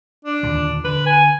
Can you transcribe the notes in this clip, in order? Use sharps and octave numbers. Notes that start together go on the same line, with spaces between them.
D4
D#2 A#2 D3
D3 B4
G#5